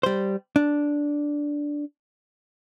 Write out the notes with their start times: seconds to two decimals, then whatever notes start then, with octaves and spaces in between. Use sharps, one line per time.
0.03 G3 C5
0.56 D4